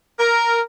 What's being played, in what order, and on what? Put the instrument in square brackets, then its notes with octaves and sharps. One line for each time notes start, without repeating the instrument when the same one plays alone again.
[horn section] A#4